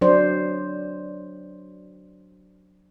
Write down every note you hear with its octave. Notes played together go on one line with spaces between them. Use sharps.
F#3 D4 C5 D5